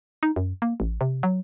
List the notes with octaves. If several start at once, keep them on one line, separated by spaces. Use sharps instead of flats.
D#4
F#2
A#3
A1
C3
F#3